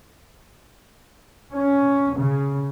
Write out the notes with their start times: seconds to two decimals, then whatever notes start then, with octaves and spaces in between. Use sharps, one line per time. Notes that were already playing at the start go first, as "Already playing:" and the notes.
1.53 C#4
2.16 C#3